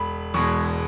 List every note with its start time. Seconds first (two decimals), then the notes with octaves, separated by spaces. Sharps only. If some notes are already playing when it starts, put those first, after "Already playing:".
Already playing: E1 B5
0.34 E2 B2 G#3 C#6